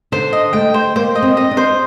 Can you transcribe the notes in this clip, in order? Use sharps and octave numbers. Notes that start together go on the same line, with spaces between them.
D3 C5
D#5
A3 G5
C5
A#3 C5
D#5
C4
D#5
D4
C5